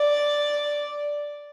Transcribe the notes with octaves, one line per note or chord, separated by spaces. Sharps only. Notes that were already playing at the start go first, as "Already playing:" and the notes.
Already playing: D5